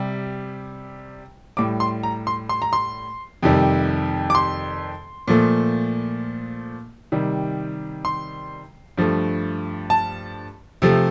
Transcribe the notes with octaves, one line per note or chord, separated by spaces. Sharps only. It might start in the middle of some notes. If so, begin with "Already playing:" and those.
Already playing: C3 G3
A2 G3 D6
C6
A#5
C6
C6
A#5
C6
F2 C3 D#3 G3
D6
C6
A#2 F3 A3
C3 D#3 G3
C6
G2 F3 A3
A5
C3 F3 A3